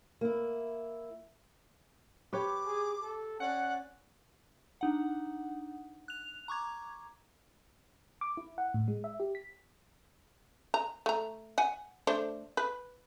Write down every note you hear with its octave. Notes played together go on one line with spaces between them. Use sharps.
A#3 E4
G4 B4 C#5 D6
G#4
A4
C#4 D5 F#5
D4 D#4 F#5
F#6 F7
A#5 C#6 D6 G#6
D6
E4
F#5
A2
G#3
E5
G4
B6
A#5
A3 A#5
F#5 G#5
A3 D4 C5
B4